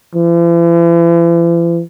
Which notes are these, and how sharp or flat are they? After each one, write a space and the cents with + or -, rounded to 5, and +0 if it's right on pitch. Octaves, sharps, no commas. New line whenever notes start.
E3 +45